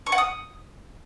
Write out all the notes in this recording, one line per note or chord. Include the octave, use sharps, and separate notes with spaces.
C#6
F#5
D#6